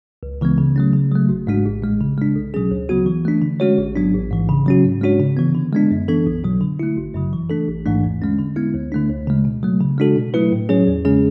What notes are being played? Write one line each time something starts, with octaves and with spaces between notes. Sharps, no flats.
C#2
C#3 E3 G#3 B3
C#3
F#3 A3 C#4
C#3
F#3 A3
G#1
G#2 G#3 D4 F#4
A1
A2 G#3
C#3
G#3 D4
B1
B2 F#3 C#4 G#4
D2
C#3 F#3 B3 F#4
E3
A3 D4
D3
G#3 C#4 F#4 C#5
A1
G#2 F#3 B3 D4
A1
G#2 E3
C#3
F#3 C#4 F#4
G#2
G#3 D4 F#4 C#5
C#3
E3 B3
D3
G#3 B3 D4
F#2
E3 B3 D4 A4
B1
B2 F#3
D3
A3 E4
G#1
F#2 C#3 F#3
E3
A3 D4 A4
A1
G#2 E3 A3 D4
E2
D3 G#3 C#4
D3
G#3 B3 E4
D2
D3 A3 D4
D2
C#3 G#3
B2
F#3 A3
C#3
G#3 D4 F#4 A4
B2
F#3 A3 E4 B4
A2
F#3 C#4 G#4 C#5
E2
C#3 G#3 C#4 G#4